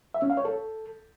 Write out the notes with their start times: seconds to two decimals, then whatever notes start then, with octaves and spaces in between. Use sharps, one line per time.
0.14 E5
0.22 C#4
0.30 F5
0.37 C#5
0.45 A4